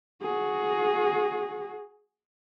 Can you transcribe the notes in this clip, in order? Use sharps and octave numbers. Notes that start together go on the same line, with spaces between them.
F#4 G#4